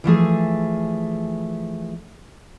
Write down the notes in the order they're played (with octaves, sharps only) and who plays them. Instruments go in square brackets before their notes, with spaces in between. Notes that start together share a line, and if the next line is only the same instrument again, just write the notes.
[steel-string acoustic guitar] E3 F3 A3 G#4